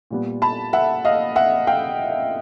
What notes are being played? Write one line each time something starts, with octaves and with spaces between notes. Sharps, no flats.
A#2 G3 B3
A5 B5
E5 F#5
D#5 F5
E5 F#5
F5 G5